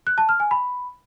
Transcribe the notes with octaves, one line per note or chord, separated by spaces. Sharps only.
F#6
A5
F6
G#5
B5